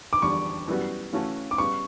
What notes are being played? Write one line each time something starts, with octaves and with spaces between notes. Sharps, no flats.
D6
E2 D3 G3 C#6
F#2 E3 G3 B3 F#4
C#3 E3 A3 C#4 F#4
D6
C#3 G3 B3 C#6